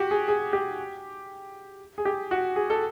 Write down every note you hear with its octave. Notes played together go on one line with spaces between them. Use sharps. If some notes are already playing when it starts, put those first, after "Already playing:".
Already playing: F#4 G4
G#4
G#4
G4
G#4
G4
F#4
G#4
A4